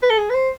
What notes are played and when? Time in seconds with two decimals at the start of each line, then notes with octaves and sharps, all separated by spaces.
0.03 B4
0.10 A4
0.18 G#4
0.30 B4
0.34 C5